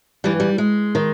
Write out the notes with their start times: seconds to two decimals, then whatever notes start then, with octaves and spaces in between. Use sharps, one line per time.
0.24 G2 E3 G3
0.40 G3
0.58 G#3
0.95 D#3